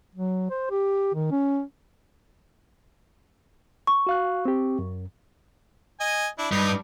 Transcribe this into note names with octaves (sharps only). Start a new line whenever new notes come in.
F#3
C5
G4
D#3
C#4
C#6
F#4 F5 F#6
C4 G4
F#2
D#5 G#5
D4 E4
G2 D#4